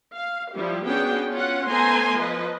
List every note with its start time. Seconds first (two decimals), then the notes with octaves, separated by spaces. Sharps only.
0.14 F5
0.53 F3 G3 E4 G4
0.85 B3 C#4 D4 F#4 G#4 G5
1.31 C#4 F4 F#5
1.68 A3 B3 C5 G#5 A#5 C6
2.18 F3 B4 D#5